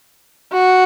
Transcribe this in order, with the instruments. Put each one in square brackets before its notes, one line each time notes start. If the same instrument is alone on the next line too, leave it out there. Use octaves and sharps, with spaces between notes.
[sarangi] F#4